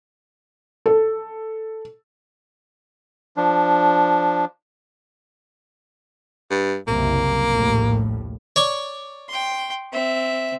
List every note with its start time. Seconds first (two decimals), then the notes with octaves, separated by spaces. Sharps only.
0.86 A4
3.37 F3 D4
6.50 G2
6.88 F#1 C2 C3 A#3
7.49 A#1 D#2 A2
8.56 C#5 D5 C#6
9.29 G5 C6
9.92 C4 E5